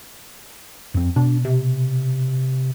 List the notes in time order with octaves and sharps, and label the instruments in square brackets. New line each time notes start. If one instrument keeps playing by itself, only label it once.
[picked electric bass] F2 C4
[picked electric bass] B2 [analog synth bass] D4
[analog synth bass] C3